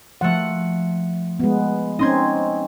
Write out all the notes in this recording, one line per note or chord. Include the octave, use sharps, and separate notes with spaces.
F3 A3 F#5
G#3 B3
C4 C#4 D#4 D#5 C6 G#6